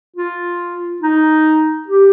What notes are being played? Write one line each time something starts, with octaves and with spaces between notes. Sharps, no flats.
F4
D#4
G4